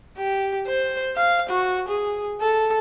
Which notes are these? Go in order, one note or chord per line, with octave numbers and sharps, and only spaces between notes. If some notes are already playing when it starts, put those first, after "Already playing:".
G4
C5
F5
F#4
G#4
A4